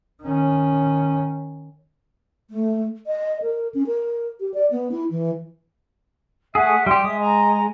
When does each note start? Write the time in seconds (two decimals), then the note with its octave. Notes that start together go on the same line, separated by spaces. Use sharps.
0.22 D#3 C#4
2.50 A3
3.07 D#5
3.42 A#4
3.74 C#4
3.87 A#4
4.40 G4
4.54 D5
4.71 B3
4.91 E4
5.11 E3
6.55 A3 G#4 E5 F#5
6.86 G3 G4 C6
7.04 G#3 E5 D#6
7.19 D#5 A#5